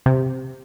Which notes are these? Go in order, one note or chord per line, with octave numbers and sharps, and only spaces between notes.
C3